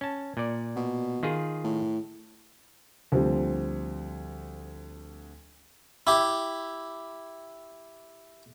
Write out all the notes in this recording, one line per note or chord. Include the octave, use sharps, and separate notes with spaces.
C#4 A5
A#2 D5
B2
D#3 F4 G#4
A2
D2 F3 G3 C4
E4 G4